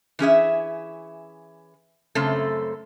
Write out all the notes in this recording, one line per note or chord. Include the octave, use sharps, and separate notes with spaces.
E3 C#4 G#4 E5
F#2 C#3 A3 C4 A4